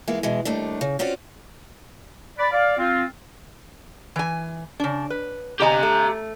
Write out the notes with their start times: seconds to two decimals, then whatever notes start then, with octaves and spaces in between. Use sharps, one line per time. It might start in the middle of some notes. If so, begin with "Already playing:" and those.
0.08 E3 G#3 A#3 B3
0.23 B2 E3 G#3
0.45 D#2 G3 A3 D4
0.81 C#3
0.99 C4 C#4 F4 F#4 D5
2.39 D5 B5
2.52 D5 F5
2.78 C4 F4
4.16 E3 G#5
4.80 C#3 D4
5.10 B4
5.60 C3 G4 D#5 G#5 A#5
5.83 A3